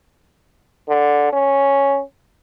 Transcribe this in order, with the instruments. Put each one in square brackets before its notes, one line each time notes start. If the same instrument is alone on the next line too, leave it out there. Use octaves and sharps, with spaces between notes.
[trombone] D3
C#4